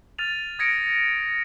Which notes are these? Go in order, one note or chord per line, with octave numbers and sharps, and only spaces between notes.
F6 A6 D#7 F7
D#6 G#6 A#6 C#7 D7